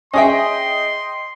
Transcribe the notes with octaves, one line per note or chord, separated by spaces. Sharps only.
C#4 G#4 D#5 E5 G5 C6